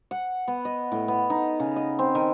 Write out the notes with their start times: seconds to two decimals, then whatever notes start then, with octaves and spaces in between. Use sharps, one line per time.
0.11 F#5
0.48 B3
0.65 D#5
0.92 A2
1.08 B3
1.30 D#4
1.60 C#3
1.76 D#5
1.99 C4
2.15 D#3